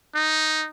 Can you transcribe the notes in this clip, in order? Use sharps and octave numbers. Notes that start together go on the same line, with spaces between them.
D#4